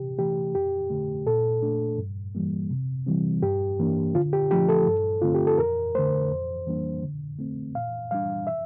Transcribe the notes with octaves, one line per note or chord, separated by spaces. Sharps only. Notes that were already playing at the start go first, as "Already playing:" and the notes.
Already playing: C3 G4
E3 A3 G4
F2 G4
D3 A3
A#2 A4
A3 D4
G2
E3 G3 A#3
C3
E3 G3 C4
G2 G4
E3 A#3 D4
D3 F4
G4
F3 A3 D4 G4
A4
G2
D3 A3 C4 F4
G4
A4
F2 A#4
D3 A3 C5
F2
E3 G3 A#3 D4
D3
A3 C4
A#2 F5
G3 D4 F5
E5